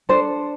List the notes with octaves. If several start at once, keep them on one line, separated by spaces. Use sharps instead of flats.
D4 A4 C5